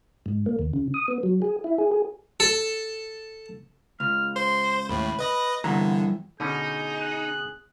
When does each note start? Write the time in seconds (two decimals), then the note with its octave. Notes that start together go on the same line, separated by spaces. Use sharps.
0.26 G#2
0.46 A#3
0.59 D#2
0.73 C#3
0.94 D#6
1.08 B3
1.23 F#3
1.42 G#4
1.64 E4
1.78 G#4
1.92 G#4
2.40 A4
4.00 C#2 F6
4.36 C5 C6
4.89 D#2 A2 B5
5.19 B4 D#5 A#6
5.64 G2 D3 E3 B3 A#5
6.40 B2 D3 C#4 D#4 G#4 G6
7.01 F#6